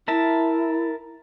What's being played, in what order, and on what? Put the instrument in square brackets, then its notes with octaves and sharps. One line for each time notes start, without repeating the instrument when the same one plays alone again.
[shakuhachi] E4 [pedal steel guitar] A#4 E5 A5